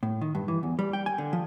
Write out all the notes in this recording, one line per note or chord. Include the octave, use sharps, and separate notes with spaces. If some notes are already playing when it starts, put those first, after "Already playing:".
A2
D#3
G2
E3
E2
G3
G5
G#5
D3
F3